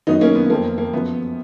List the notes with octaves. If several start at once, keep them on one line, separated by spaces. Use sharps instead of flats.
F#2 D#3 F#3 B3 D#4
A#3 C#4
B3
F2 F3 A#3
A#3
F#2 F3 B3